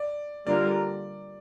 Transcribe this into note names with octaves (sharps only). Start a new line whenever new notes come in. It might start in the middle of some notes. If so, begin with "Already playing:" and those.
Already playing: D5
D3 G3 A#3 F4 A#4 D5